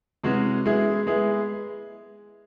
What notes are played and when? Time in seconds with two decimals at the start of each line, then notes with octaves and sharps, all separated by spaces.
0.24 C3 E3 G#3 C#4 F#4
0.65 G#3 B3 E4 G#4
1.07 G#3 B3 E4 G#4